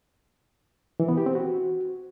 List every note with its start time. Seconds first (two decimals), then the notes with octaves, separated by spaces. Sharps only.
1.00 E3
1.08 B3
1.17 G4
1.26 C4
1.35 F#4